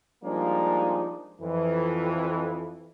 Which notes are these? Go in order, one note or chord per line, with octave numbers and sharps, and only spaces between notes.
F3 G3 G#3 A#3 D4 D#4
F2 E3